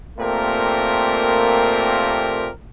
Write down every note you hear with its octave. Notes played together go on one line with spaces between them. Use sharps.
A#2 A3 A#3 C4 G4 A#4